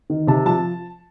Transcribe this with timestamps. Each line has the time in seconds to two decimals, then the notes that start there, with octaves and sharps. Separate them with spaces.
0.10 D#3
0.27 C3 A5
0.46 F3 A5